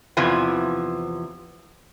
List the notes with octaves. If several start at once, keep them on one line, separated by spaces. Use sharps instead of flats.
E2 C3 E3 F3 G#5